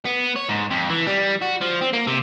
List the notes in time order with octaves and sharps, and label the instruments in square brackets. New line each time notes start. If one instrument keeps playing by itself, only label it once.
[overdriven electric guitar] B3
C#5
G#2
F2
E3
G3
F#4
F3
C4
A#3
C3